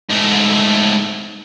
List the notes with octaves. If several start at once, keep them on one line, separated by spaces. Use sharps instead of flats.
G#2 A3